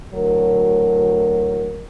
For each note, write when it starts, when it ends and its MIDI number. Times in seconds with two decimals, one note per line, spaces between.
0.14 1.83 38
0.14 1.83 45
0.14 1.83 54
0.14 1.83 70